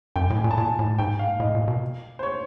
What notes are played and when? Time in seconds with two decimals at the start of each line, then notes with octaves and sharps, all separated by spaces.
0.16 F#2 G5
0.30 A2
0.37 G#5
0.44 A#2
0.51 A5
0.57 A#2 G#5
0.79 A2
0.98 G#2 G5
1.19 F5
1.40 A2 D#5
1.55 A#2
1.68 B2
2.19 C5
2.23 C#5